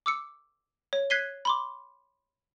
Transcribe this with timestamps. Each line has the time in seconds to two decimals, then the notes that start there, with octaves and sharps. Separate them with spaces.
0.06 D6 E6 C#7
0.93 C#5
1.10 F#6 G#6 B6 C7 D#7 G7
1.45 B5 C6 D6